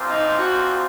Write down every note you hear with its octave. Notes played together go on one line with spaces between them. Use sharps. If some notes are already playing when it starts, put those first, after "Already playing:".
Already playing: C2 A#2 F3 C4 F4
D#4
F#4